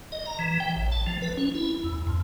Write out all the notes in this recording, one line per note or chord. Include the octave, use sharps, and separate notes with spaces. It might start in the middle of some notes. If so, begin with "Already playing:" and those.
D#5
A#5
E3
G5
A1
A5
F3
B4
C#4
E4
E2
F2